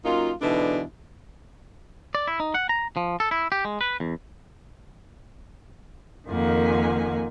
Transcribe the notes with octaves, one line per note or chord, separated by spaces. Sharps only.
F#2 A#3 D#4 F4
G#2 B2 D3 E3 D4
D5
E4
D#4
F#5
A#5
F3
A4
E4
G4
G#3
B4
E2
F2 D#3 A#3 F#5 G#5